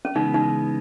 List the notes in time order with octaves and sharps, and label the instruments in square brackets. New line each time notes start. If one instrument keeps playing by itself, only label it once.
[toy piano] C#4
[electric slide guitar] C#3 E3 G#3 B3 [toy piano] D#4
[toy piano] D#4